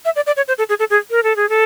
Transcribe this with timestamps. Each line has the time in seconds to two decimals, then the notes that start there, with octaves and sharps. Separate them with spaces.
0.05 E5
0.16 D5
0.26 D5
0.37 C#5
0.48 C5
0.58 A4
0.69 G#4
0.79 A4
0.90 G#4
1.11 A#4
1.23 A4
1.36 G#4
1.49 A4